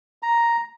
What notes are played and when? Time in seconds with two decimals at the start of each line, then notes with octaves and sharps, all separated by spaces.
0.23 A#5